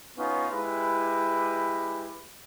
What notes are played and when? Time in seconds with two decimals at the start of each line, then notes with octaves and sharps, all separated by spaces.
0.18 B3 C#4 D#4 F4
0.52 G#3 E4 G4 B4